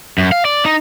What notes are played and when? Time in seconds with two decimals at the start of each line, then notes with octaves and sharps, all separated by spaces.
0.18 F#2
0.32 F5
0.45 D5
0.65 D#4